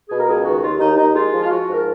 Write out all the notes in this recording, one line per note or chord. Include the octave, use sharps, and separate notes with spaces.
B2 G#4
A#4
C#2 G#4
D#3 F#4
D#2 F4
D#2 D#4
D#2 D#4
G#3 F4
F3
F4
F3 F#4
G#2
A#4